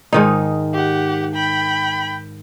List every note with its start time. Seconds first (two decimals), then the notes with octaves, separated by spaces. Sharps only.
0.13 G#2 D#3 D#4
0.73 G4 F#5
1.34 G5 B5